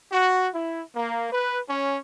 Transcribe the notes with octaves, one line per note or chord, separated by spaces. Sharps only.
F#4
E4
A#3
B4
C#4